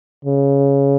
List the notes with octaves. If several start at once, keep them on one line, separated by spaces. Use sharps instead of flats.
C#3